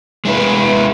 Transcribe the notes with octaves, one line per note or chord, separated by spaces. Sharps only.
G#3 E4 B4